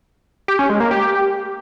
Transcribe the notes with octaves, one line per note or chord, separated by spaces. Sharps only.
G4
C#4
G#3
A#3
G4